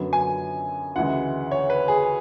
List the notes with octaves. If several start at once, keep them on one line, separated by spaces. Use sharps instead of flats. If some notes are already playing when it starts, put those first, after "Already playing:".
Already playing: F#2 D3 F#3 B3
G#5
D2 C#3 E3 G#3 F#5
C#5
B4
G#4